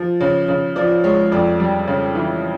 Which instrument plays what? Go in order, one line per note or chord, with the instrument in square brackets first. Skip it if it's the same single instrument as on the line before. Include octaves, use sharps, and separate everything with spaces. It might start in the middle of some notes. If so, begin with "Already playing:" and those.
Already playing: [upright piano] F3
C#3
C#3
F3 D5
G#3 C#5
F2 D5
G3
C#3
E3